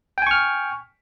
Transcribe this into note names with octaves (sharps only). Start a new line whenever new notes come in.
G5 G#5 C#6 F6